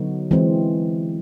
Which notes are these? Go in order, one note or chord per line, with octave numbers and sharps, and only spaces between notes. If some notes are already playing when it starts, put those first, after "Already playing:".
Already playing: D3 F#3 B3 D#4 F#4
E3 G#3 C4